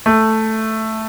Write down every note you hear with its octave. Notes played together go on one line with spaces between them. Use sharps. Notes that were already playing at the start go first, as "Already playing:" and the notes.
A3